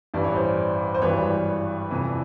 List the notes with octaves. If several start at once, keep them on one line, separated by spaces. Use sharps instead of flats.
A1 G2 E3 D5
C#5
C5 D5
C5
G#1 G2 E3 G3 B4 C#5
F2 C3 E3